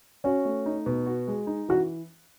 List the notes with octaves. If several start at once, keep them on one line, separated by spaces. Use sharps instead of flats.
C#4 F#4
A3
D#4
B2
F#4
G#3
D#4
E3 F#4